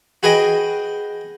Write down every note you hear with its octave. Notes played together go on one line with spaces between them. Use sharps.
F#4 G#4 B4 D#5 G5